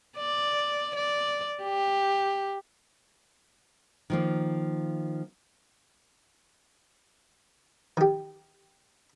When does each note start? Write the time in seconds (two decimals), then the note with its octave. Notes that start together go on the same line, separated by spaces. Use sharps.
0.18 D5
0.96 D5
1.63 G4
4.10 D#3 F3 A#3
7.97 D#3 G4